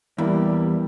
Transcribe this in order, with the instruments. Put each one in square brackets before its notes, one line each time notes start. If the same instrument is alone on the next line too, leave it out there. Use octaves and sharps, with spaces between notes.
[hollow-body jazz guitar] E2 [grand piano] E3 A#3 E4 [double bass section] G3